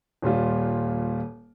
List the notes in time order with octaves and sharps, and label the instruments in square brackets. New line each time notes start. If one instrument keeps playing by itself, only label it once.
[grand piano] D#1 A#2 G3 F4